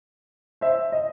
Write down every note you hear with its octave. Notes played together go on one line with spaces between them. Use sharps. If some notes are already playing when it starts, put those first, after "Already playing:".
C5 E5
D#5